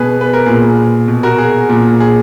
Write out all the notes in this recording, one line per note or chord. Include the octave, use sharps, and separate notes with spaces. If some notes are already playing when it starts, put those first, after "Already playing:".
Already playing: B2 G#4 B4
B4
A#4
A#2 G#4
B2
F#4 A#4
G#4
A#2
G#4